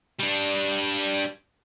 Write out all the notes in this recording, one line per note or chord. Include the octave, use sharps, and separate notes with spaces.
G3 D4